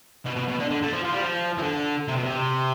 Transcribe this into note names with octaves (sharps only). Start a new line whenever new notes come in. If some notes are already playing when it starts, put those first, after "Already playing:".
B2
B2
B2
D3
D3
A3
F3
F3
G3
F3
E3
D3
C3
B2
C3